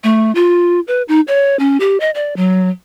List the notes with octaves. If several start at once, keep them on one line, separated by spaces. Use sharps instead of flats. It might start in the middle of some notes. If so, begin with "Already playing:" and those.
A3
F4
B4
D#4
C#5
C#4
G4
D#5
D5
F#3